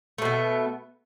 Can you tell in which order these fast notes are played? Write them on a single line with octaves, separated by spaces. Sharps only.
A3 B2 B3